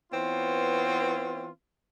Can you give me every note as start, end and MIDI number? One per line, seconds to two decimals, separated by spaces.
0.12 1.49 52
0.12 1.49 59
0.12 1.49 60
0.12 1.49 65
0.12 1.49 73